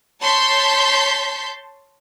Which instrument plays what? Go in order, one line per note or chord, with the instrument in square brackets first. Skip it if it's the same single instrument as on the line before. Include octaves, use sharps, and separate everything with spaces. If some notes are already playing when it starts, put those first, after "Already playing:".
[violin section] C#5 A5 C6 G6 B6